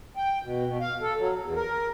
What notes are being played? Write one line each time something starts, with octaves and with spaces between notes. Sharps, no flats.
G5
B2
B2
F5
A4
F#3
E2
A#4